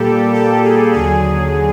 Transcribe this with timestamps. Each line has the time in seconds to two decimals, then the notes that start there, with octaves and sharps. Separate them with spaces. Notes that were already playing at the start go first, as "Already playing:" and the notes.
Already playing: A#2 G3 A#3 G4 A4
0.34 G4 A4
0.63 G#4
0.93 D#2 D3 F#3 G#4